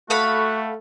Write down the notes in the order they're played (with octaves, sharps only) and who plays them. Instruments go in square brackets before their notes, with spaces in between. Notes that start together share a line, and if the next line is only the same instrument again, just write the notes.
[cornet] A3 [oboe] F#4 [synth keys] A4 [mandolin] F5 F#5 B5